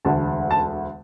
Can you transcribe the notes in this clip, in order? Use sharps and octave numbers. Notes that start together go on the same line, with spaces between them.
E1 D2 D3 A5
A5